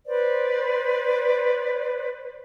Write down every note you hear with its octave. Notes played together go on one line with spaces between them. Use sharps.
B4 C5 D5